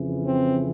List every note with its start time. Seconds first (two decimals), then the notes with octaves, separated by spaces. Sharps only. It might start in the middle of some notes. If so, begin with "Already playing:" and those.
Already playing: F2 C#3 E3
0.27 C4